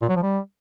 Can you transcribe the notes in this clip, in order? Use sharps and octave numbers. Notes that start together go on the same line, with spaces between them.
A#2
F#3
F3
G3